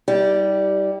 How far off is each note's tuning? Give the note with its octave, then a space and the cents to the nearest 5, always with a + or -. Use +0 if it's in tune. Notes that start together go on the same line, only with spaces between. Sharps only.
G3 -10 E4 -45 G4 +0